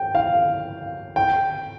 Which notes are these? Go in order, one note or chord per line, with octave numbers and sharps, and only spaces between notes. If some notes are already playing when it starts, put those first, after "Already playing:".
Already playing: G5
F5
G5